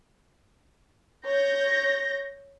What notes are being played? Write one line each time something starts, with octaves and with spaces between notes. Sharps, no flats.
C#5 G6 A#6